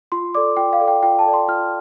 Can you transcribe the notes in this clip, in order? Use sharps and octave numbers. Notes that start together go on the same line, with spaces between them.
F4 C6
A4 D5 D6
F4 G5
F5
A4 D5
G5
F4 G5
A5
A4 D5
C6
F4 F6